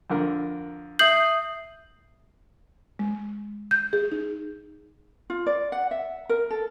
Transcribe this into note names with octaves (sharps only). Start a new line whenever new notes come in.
F2 D3 A#4
E5 D#6 G6 C7 F#7
G#3
G6
G#4
D#4
F4
D5
F#5
E5
A#4
A4